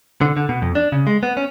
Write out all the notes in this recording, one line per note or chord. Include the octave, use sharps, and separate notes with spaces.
D3
D3
B2
F2
D4
C#3
G#3
B3
C#4